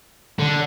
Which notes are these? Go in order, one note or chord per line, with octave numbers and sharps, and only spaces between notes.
D3